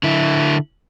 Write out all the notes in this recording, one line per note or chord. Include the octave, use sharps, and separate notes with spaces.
D3 E4